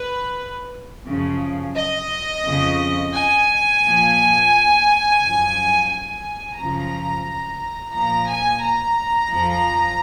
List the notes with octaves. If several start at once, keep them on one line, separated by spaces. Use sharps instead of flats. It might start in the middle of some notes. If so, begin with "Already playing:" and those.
Already playing: B4
F#2 C#3 F3
D#5
F2 C#3 F3
G#5
A#2 F3
F#2 F3
G#5
F#2 C#3 F3 A#5
A#2 F3 A#5
G#5
A#5
F2 F3